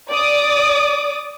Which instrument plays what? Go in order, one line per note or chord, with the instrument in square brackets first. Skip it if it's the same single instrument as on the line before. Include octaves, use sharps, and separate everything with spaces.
[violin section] D5 D6 D#6